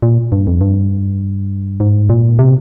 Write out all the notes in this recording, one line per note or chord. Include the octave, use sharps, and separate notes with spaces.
A#2
G2
F2
G2
G#2
A#2
C3